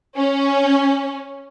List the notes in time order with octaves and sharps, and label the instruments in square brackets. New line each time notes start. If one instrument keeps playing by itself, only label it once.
[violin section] C#4